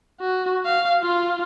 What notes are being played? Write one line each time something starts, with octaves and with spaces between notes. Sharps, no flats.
F#4
F5
F4